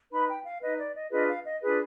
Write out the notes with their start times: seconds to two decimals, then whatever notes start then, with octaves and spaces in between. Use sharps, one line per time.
0.10 D#4 B4 B5
0.27 G5
0.43 F5
0.60 D#4 B4 D#5
0.77 D5
0.94 D#5
1.10 D4 F4 G#4 B4 D#5
1.27 F5
1.43 D#5
1.61 D4 F4 G#4 B4